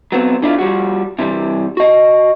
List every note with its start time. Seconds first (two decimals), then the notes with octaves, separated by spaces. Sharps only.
0.12 F#3 B3 C4
0.42 D3 D4 E4 F4
0.58 F3 G3 F#4
1.19 C3 E3 G3
1.77 F#4 D#5